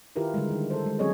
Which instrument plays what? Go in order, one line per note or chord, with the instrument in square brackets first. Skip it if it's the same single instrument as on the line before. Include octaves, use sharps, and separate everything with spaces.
[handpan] D#3 E4 F4 G4 A#4 B4
D3 G3 G#3
D#3
A4 C5
G3 G#3
F#3 C4 C#4 G#4 C#5 D#5